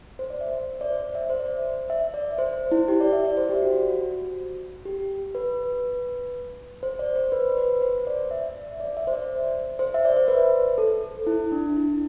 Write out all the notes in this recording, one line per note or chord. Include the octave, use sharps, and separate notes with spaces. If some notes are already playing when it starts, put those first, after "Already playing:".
C5
D5
E5
D5
C5
E5
C5
D5
E5
D5
C5
E4
G4
D5
E5
D5
C5
G4
F#4
F#4
F#4
G4
B4
C5
D5
C5
B4
B4
C5
D5
E5
D5
E5
C5
D5
C5
E5
D5
C5
B4
A4
E4
D4
E4